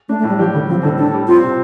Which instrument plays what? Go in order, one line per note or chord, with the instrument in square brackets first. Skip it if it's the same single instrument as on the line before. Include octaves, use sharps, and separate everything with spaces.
[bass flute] A3 [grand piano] D4
[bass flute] A3
[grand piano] A2
[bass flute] G3
[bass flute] F3 [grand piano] G4
[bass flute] D3 [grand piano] G3
[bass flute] F3 [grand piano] C4
[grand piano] A2 [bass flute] D3
[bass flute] D4 [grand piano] A4
[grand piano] G3
[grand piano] C4 [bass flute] F4
[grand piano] C3